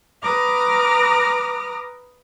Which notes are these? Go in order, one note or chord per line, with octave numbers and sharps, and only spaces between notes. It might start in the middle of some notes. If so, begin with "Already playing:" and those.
B4 A#5 D6 D#6 F6 A#6